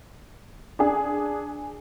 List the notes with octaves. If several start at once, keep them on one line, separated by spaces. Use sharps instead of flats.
D4 G#4